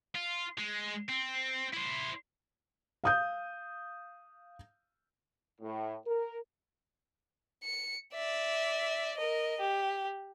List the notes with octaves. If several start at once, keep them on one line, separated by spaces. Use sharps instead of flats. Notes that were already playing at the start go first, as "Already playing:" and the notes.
F4
G#3
C4
E4 C5
F5 D#6 G6
A2
A#4
C#7
D5 E5
A#4 D#5
G4